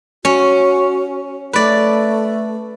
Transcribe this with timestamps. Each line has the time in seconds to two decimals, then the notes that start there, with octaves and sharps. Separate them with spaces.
0.25 C#4 F#4
1.53 A3 B4 D5